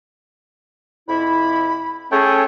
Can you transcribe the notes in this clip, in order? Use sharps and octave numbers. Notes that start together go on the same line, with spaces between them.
F2 C3 E4 B5
A3 C#4 G#4 A4 C#5 G5